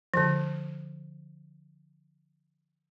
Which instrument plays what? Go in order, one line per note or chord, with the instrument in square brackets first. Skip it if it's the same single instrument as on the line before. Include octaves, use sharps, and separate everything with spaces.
[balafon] D3 F3